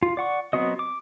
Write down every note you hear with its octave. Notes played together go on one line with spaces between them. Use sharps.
F4
D5 F#5 C#6
F#3 B3 C4 F#4 D#5
D6